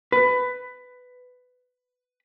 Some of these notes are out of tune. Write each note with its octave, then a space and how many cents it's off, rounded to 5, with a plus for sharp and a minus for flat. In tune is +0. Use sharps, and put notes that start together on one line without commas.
B4 +15